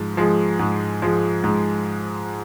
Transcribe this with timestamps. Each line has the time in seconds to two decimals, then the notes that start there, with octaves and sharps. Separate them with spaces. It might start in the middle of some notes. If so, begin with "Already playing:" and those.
Already playing: G#2 F3
0.17 F3 G#3
0.59 G#2
1.02 F3 G#3
1.44 G#2